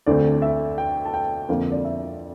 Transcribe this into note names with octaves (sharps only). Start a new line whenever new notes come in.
D2 D3 A3 C4 D5
E5
G5
A5
G5
F2 D3 F3 A#3 F5
D5
E5